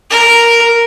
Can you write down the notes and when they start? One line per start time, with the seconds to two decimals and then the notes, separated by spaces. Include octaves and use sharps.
0.10 A#4